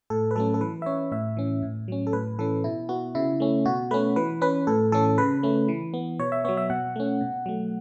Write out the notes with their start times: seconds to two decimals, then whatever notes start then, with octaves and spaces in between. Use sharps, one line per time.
0.10 A2 A4
0.31 B4
0.36 F#3 A3 C#4 A4
0.54 A4
0.61 E3 B4
0.82 E5
0.86 C#4 C#5
1.12 A2 E5
1.37 E3 C#4
1.63 A2
1.88 F#3 C#4
2.07 A4
2.13 A2 B4
2.39 E3 C#4 A4
2.64 B2 E4
2.89 B3 F#4
3.15 C#3 E4
3.40 A3 C#4
3.66 B2 F#4
3.91 A3 C#4 B4
4.16 E3 B4
4.42 C#4 B4
4.67 A2 A4
4.92 E3 C#4 A4
5.18 C#3 B4
5.43 A3 C#4
5.68 E3
5.94 B3
6.20 B2 C#5
6.32 E5
6.45 F#3 B3 C#5
6.57 E5
6.70 B2 F#5
6.96 A3 C#4
7.21 B2
7.46 F#3 A3